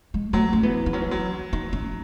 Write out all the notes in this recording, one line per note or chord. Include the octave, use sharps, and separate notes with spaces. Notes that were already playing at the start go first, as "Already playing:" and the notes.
G#3
F#3 A3
C#4
E3 B3
D#4
F#3 C#4
E3
F#3
D#4
C#4